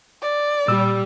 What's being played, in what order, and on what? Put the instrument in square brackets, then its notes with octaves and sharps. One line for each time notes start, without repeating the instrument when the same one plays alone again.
[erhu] D5
[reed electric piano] A#2 E6 [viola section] G3